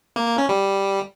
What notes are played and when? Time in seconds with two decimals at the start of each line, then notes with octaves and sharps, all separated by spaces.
0.16 A#3
0.27 A#3
0.38 C#4
0.49 G3